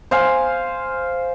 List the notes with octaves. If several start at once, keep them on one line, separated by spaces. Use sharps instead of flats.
C5 F5 G#5